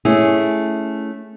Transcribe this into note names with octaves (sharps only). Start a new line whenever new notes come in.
A3 C#4 E4 G#4